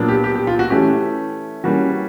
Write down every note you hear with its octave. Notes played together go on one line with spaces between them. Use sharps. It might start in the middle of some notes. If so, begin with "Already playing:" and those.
Already playing: A#2 F#3 B3 D4
G4
G4
G4
F4
F#4
E3 A3 C#4 G4
E3 G3 A#3 C#4 F#4